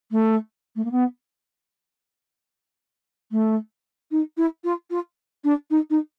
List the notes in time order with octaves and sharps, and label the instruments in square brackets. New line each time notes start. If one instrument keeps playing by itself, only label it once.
[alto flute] A3
A3
A#3
B3
A3
D#4
E4
F4
F4
D4
D#4
D#4